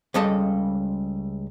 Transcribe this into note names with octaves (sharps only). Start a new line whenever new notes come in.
C#2 C#3 G3 A4 D#5 A5